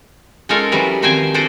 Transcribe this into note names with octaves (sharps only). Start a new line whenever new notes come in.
G#3 C#4 D#4 F4 A4 A#4
E3 F#3 G3
D#3 F3 C4 C5 G5 G#5
D4 A4 C5 D5 D#5